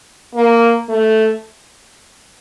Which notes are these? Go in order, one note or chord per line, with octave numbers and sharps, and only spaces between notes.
A#3
A3